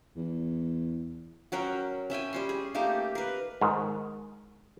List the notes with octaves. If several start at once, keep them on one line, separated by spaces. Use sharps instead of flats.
E2
F#3 C#4 A#4 G5
C#4 E5 G5 G#5
G3 C#4 C6
G#4
A3 A#3 D#4 G4
A#4 B4
G#2 D#3